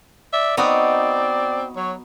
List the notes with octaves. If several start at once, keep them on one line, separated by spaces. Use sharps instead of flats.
D5 E5
B3 C4 D#4 F#4 D5
F#3 C#5